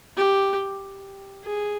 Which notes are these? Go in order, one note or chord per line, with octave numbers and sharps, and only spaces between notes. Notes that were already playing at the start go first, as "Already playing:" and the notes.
G4
G#4